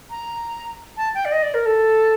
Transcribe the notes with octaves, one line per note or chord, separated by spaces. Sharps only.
A#5
A5
G5
D5
D#5
D5
A#4
A4